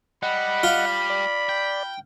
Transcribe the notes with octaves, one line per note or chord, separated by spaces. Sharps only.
G3 D#5 F#5 B5
F4
D5
G5